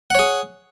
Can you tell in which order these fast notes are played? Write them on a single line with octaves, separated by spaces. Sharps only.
F#5 C#5 G#4